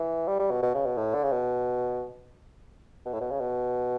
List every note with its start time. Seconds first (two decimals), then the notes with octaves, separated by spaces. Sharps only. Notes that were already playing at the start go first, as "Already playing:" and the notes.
Already playing: E3
0.28 G3
0.39 G3
0.50 B2
0.62 B2
0.74 C#3
0.86 B2
0.97 A2
1.14 D3
1.23 C#3
1.32 B2
3.06 B2
3.13 A2
3.21 B2
3.31 C#3
3.40 B2